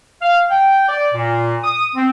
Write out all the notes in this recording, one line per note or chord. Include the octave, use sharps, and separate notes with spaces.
F5
G5
D5
A#2
D#6
C4